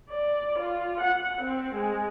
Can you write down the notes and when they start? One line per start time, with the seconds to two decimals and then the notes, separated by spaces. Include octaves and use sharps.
0.10 D5
0.59 F4
1.01 F#5
1.42 C4
1.75 G#3